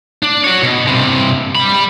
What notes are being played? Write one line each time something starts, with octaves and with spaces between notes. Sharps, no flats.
D4
F#4 C#5
B2
G2 C3
G3 B5